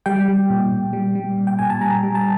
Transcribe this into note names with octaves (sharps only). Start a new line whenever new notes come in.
G3 G5
G3
A#2
A#2
G3
G3
A#2
G5
A#2 G#5
A5
G3 A#5
G3
A5